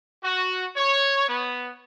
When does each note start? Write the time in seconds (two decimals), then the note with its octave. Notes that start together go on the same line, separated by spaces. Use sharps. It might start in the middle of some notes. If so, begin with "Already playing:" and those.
0.23 F#4
0.76 C#5
1.29 B3